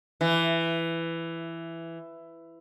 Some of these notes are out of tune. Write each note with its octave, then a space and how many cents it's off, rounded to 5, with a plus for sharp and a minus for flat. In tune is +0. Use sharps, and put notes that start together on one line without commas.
E3 +10